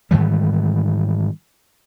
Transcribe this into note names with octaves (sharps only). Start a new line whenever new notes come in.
G#2 D#3 E3 G3